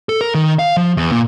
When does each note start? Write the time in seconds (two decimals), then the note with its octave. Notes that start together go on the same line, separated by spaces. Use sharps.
0.09 A4
0.21 A#4
0.34 D#3
0.59 F5
0.77 F3
0.97 E2
1.12 A#2